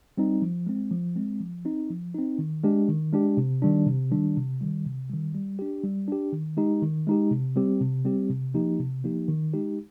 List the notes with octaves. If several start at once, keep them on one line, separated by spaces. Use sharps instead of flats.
G3 C4 D#4
F3
G#3 C4
F3
G#3 C4
F3
C4 D#4
F3
C4 D#4
D#3
G#3 D4 G4
D#3
G#3 D4 G4
C3
D#3 G3 D4
C3
D#3 G3 D4
C3
D#3 G3
C3
D#3 G3
G3
D4 G4
G3
D4 G4
D#3
G#3 D#4 G4
D#3
G#3 D#4 G4
C3
G3 C4 G4
C3
G3 C4 G4
C3
F3 A#3 D#4 G4
C3
F3 A#3 D#4 G4
D#3
G#3 D#4 G4